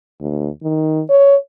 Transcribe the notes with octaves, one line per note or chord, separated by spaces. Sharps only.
D2
D#3
C#5